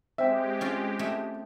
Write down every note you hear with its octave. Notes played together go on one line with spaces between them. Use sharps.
G#3 C4 G4 E5 G5
C#4 F4
A3